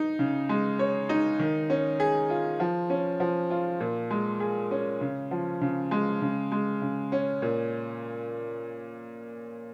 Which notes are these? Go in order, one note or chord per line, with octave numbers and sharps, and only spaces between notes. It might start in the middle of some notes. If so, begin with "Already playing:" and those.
Already playing: D#4
C#3
G#3
C#5
D#4
D#3
C#4
G#4
F4
F3
C#4
F3
F4
A#2
G#3
G#4
C#4
C#3
F3
C#3
G#3
C#3
G#3
C#3
C#4
A#2